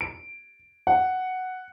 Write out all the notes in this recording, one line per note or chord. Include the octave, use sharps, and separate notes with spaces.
D7
F#5